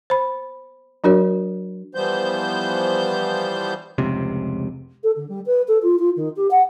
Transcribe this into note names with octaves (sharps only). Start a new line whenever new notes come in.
C5 B5
F#3 D4 F#4 A#4 C#5
E3 F3 G3 B3 C5 G6
F1 C#2 C3
A4
D3
G3
B4
A4
F4
F4
D#3
G4
F#5